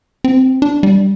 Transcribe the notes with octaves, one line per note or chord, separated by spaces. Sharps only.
C4
D4
G3